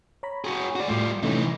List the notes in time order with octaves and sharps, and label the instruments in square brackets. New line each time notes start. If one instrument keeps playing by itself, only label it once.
[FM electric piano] C#5 A#5 B5
[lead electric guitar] F#4 G#4
F#4 D5
[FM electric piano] A2 A3 [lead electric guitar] G3 F4
[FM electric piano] C3 A3 C#4 [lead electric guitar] E3 D#4